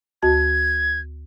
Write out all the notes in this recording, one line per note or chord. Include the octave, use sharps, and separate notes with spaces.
D2 F#4 A5 G#6